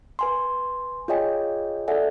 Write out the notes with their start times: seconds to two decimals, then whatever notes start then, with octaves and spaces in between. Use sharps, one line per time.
0.19 B4 G#5 C6
1.08 F4 G#4 C#5 D#5 G5 G#5
1.88 A4 D5 E5 F#5 G#5